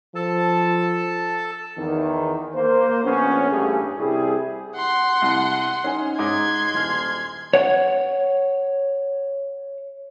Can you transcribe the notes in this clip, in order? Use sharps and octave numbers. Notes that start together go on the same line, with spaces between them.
F3 A4 A5
E2 D#3
A#3 C5
A#1 B3 C#4
A1 G2 G3 A3 G#4
C2 G3 E4 G#4
F#5 C6
C2
C#4 D#4 G#5
G#2 D#4 C6 D6 G#6
D#1 F6
C#5 F#5